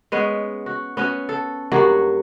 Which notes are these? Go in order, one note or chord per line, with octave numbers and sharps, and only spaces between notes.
G#3 B3 C#4
F#4
B3 C#4 F#4
A4
G2 F#3 A#3 F#4